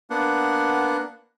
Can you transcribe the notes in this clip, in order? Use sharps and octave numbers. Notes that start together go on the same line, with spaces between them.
A#3 B3 D4 F#5